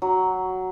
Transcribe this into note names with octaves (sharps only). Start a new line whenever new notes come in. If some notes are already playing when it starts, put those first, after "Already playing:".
F#3